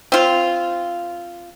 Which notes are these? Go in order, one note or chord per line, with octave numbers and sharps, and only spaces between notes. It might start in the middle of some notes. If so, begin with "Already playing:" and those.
C4 F4